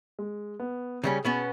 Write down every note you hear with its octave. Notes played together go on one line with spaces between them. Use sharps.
G#3
B3
C#3 G3 C#4 G#4
B2 B3 C#4